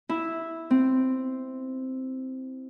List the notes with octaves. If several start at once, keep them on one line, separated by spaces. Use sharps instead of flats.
E4
C4